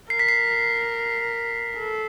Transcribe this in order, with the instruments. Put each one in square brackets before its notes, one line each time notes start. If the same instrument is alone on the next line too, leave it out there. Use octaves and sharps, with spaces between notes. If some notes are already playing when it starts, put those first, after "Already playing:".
[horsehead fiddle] A#4 [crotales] C7
[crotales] B6
C7
[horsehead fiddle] A4